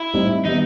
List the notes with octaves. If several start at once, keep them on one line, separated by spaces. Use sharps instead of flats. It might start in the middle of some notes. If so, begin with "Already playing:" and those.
Already playing: E4
A2 G3 C4 D#4
D#3 G3 B3 D#4